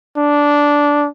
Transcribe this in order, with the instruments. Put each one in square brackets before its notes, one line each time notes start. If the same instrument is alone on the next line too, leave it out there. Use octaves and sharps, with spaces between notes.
[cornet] D4